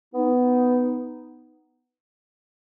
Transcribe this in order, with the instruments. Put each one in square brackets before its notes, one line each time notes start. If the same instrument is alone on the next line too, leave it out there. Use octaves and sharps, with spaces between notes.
[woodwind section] B3 D#4